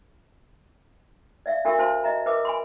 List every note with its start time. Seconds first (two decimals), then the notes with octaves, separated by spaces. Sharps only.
1.46 D5 E5 F5
1.65 D4 F#4 G4 A4 A#4 E5
1.78 D4 F#4 C5 F5 A5 C6
2.04 D#5 E5 A#5
2.26 A#4 B4 E5 D6
2.45 G#5 B5 C6